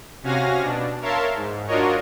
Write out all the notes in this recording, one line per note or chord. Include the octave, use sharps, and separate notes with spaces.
C3 C#4 F#4 F5 G#5 A#6
B2 D4
A#4 C#5 E5 F5 A5 C6
G#2
D4 F4 F#4 A#4 C#5 D#5